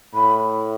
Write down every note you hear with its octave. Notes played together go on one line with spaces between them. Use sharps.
A2 B5